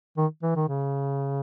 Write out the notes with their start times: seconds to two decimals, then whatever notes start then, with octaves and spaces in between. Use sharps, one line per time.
0.17 D#3
0.43 E3
0.56 D#3
0.69 C#3